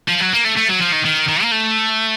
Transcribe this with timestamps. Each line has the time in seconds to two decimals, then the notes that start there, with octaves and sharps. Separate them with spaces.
0.08 F3
0.21 F#3
0.33 A#3
0.44 A3
0.56 A3
0.68 F#3
0.81 F3
0.92 D#3
1.05 D#3
1.28 D#3
1.43 A#3
1.52 A3